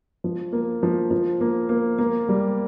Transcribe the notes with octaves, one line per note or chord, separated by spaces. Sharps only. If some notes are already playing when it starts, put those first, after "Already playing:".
F3
A#3
F3
F3
A#3
A#3
A#3
G3